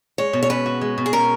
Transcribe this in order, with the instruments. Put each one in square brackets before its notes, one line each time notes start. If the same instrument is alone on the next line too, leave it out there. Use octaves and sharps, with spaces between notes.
[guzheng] G#3 [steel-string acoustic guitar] C#5
[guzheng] B2
[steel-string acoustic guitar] C#5
[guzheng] C#4 [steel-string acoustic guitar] B4
[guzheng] F#4
G#3
B2
[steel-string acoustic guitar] G#4
[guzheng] C#4 [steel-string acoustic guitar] A#4